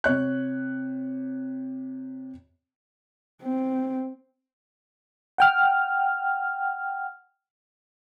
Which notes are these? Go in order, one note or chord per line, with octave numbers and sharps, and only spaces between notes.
C3 C#5 F#6
C4
F#5 G5 F6